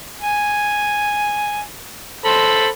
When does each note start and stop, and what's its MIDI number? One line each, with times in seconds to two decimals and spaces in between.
0.22 1.61 80
2.25 2.67 69
2.25 2.67 72
2.25 2.67 83